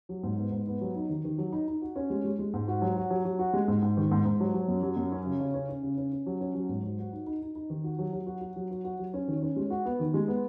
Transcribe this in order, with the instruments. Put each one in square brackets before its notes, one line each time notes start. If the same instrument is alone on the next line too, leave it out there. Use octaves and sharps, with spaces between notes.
[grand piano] F#3
G#2
B3
G#2
B3
F#3
D#4
D#3
D#3
F#3
D#4
D#4
F#4
C#4
G#3
G#3
G#3
G#2
F#4
F#3
F#4
F#3
F#3
F#4
G#3
G#2
G#2
D#3
G#2
G#2
F#3
F#3
F#2
F#3
F#2
C#4
C#3
C#3
C#4
C#4
C#3
C#4
C#4
F#3
C#4
F#3
G#2
F#3
F#4
D#4
D#4
D#4
D#4
D#3
F#4
F#3
F#3
F#4
F#4
F#3
F#4
F#4
F#3
C#4
D#3
C#4
G#3
F#4
B3
D#3
G#3
B3